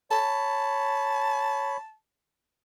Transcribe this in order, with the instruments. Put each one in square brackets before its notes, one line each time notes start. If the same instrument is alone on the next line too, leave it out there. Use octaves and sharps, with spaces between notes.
[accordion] C#5 B5 [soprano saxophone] A5